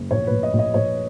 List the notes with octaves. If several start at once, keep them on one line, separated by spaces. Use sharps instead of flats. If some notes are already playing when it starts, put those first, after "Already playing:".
Already playing: F#1
A#1 C#5
A#1 B4
D#5
A#1
D#5
A#1 C#5